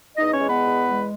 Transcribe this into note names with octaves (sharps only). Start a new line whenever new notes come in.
E2 D#4 D#5
C#4 C#5
G#3
B3 B4
E2
G#3